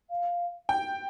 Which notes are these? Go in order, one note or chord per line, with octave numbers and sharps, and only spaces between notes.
F5
G5